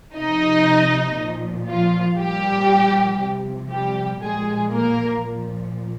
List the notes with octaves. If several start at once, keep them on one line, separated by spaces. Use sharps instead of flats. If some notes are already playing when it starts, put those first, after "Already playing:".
C3 F3 D#4 D#5
A#2 F3
F3 F4
A#2 F3 G3 G4
C3 F3
G3 G4
A#2 F3 G#3 G#4
A#3 A#4
A#2 F3